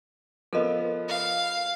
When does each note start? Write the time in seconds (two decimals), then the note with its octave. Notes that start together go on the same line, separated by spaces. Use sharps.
0.53 F3 B3 A4 A#4 D#5
1.09 F5